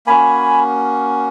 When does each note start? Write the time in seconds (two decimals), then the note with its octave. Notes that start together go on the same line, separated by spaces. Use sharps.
0.07 A#3 C#4 F#4 G#5 B5